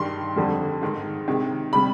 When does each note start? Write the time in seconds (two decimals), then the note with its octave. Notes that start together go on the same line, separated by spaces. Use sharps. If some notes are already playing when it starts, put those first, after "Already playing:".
Already playing: G2 D#3 G3 C6
0.36 F2 D3 G3
0.82 G#2 D#3 G#3
1.28 C3 D#3 G#3
1.73 C3 G3 B5